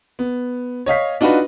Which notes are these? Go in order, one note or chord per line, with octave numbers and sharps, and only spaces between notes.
B3
C#5 D#5 F5 B6
D4 D#4 F4 F#4 B4